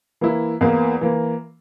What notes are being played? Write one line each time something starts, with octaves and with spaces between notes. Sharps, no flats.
E3 A#3 E4
E2 E3 A#3
E3 A#3